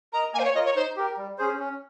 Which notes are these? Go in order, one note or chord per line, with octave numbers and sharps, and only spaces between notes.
A#4 D#5 A#5
A#3 G#5
C5
C#5
F4 A#4 D#5
C#5
D#4 C5
G4 A#4
G3
C#4 G#4 C5
C#4